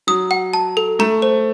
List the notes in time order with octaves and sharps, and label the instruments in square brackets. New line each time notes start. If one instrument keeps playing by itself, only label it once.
[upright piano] F#3 [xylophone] D#6
[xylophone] F#5
A5
A4
[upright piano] A3 [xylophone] A#5
[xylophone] C5